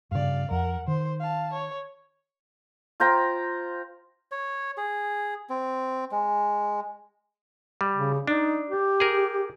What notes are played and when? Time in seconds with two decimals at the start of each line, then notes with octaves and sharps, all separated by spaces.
0.11 G2 C#3 D5 F5
0.51 F2 A#4 F#5
0.88 D#3 C5
1.20 F5 A5
1.53 C#5
3.00 F4 C5 G5 A#5
4.32 C#5
4.78 G#4
5.50 C4
6.11 G#3
7.81 G3
7.96 C#3
8.27 D4 D#4
8.69 G4
9.00 G#4 A#4